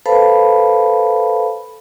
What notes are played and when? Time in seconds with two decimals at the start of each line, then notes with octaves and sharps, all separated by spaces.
0.06 A4 B4 C5 F5 A5 B5